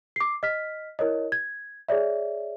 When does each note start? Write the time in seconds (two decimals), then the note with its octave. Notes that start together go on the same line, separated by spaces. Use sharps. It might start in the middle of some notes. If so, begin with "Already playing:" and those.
0.16 D6 C7
0.43 D#5 F6 B6
0.99 E4 A#4 C#5 D#5
1.32 G#6
1.89 G#4 C#5 D5 E5